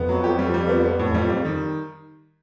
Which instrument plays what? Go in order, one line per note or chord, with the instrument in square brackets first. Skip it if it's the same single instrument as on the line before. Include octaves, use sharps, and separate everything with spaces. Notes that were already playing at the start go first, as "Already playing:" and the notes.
Already playing: [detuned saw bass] F2 [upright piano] B3
[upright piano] F#3
G4
G3
G3
B3
B3
A2
[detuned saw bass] E2
[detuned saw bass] F2 [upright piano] G3
[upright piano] G3
D#3